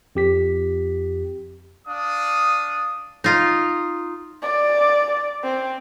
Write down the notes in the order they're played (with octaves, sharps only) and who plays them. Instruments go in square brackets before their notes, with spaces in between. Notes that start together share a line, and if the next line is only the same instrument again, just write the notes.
[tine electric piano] F2 G4 B6
[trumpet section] D4 F5 D#6
[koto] D#4 F4
[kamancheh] D5
C4